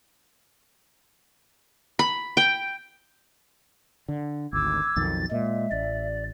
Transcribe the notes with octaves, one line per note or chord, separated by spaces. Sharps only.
B5
G5
D3
G#1 D2 D6 E6 G#6
B1 F2 D#3 A6
A#2 G#3 E5
A1 D5